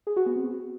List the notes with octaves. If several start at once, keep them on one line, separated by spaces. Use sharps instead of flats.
G#4
F#4
B3
C4